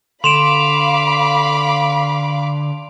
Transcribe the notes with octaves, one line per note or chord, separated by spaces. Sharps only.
D3 F5 B5 C6 D6 D7 E7 F7